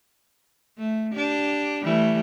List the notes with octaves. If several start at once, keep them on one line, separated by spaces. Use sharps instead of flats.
A3
D4 G4
E3 G3 A3